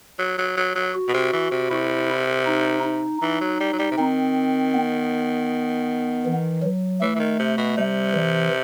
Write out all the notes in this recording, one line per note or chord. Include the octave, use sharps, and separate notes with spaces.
F#3
F#3
F#3
F#3
F#4
B2
C3
E3
C3
C3 E4
D#4
D#4
E3 D#4
F#3
G3
F#3
G3
C3
D#3 C4
B3
E3
F#3
E3 A3
E3
D#3
C3
B2
C3 G3
E3